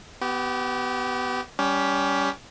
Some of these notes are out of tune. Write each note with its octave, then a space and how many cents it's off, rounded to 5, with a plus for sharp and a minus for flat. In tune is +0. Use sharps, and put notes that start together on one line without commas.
B3 +10 G4 -25
G3 +0 C#4 +20 G4 +0